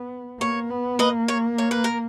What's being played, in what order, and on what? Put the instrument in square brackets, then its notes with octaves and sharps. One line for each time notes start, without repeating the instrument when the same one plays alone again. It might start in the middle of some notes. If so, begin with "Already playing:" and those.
Already playing: [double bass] B3
[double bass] A#3 [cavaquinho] C#5
[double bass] B3
[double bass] A#3 [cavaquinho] B4 D#5
[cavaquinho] C#5
C#5
B4
A#4